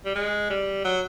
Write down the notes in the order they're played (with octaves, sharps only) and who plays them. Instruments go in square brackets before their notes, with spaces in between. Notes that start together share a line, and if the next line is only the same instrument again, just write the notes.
[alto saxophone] G3
G#3
G3
F#3